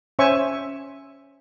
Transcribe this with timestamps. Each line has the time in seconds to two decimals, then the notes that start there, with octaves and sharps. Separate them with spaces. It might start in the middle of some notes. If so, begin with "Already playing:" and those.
0.19 C#4 C5 C#5 E5 G#5 C#6